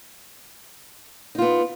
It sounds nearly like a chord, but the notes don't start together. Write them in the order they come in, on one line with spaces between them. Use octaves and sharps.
D#4 F4 B3